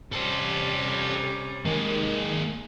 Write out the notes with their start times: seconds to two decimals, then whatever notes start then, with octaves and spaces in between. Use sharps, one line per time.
0.12 C3 G3 C#4 A4 C5
1.66 D#3 G#3 A#3